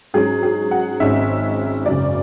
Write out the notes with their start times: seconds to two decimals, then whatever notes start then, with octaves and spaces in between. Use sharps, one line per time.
0.14 G#2 F#3 C#4 G#4
0.43 G#4
0.71 F#5
1.00 G#1 G#2 G#3 C#4 E5
1.85 F#1 F#2 C#3 D5